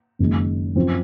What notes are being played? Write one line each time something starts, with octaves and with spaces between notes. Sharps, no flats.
F#1 F#2 D#3 G#3
F#2 F3 C4